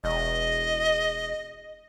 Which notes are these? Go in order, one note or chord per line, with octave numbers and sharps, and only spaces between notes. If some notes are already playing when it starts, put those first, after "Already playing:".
E1 D#5